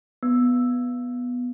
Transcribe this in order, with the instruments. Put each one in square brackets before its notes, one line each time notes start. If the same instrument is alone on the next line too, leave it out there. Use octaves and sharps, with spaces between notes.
[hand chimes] B3